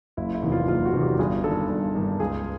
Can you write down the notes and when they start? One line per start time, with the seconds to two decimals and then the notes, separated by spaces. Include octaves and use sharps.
0.17 F#1 E4
0.34 E4
0.42 E2 C3 D#3
0.52 F4
0.68 F#1 F4
0.85 F#4
0.93 E2 C3 D#3
1.02 G4
1.19 G1 G#4
1.44 G2 D#3 A4
1.69 G1
1.95 G2 D#3
2.19 C#2 G#4